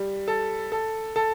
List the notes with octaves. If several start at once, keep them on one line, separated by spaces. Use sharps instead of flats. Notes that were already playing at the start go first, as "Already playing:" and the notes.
Already playing: G3
A4
A4
A4